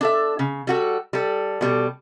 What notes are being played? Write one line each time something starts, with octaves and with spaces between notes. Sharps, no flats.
D4 A4 E5
C#3
G3 F#4 A4
G3 A4
B2 G3 A4